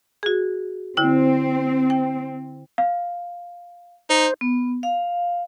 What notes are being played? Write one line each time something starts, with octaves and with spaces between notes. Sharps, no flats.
F#4 G#4
D3 C4 E4 G5
G5
F5
D#4 C5
B3
F5